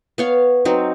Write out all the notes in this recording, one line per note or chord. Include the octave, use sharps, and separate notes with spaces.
B3 C#5 F5
F#3 C4 D#4